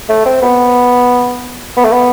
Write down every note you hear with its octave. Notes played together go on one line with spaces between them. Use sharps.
A3
C4
B3
B3
A3
B3